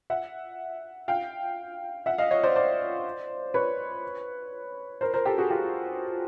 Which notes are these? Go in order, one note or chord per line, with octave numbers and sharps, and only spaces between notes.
E5 F#5
F5 G5
E5 F#5
D#5 F5
C#5 D#5
C5 D5
C5 D5
B4 C#5
A#4 C5
A#4 C5
G4 A4
F#4 G#4
F4 G4